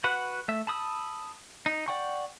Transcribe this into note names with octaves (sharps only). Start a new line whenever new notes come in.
F#4 B4 F#5
A3 E5
A5 B5 D#6 E6
D#4
D5 F#5 G5 C#6